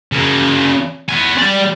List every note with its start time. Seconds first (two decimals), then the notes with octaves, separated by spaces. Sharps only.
0.12 C#3 A#3
1.09 B3 G#5
1.38 G3 D5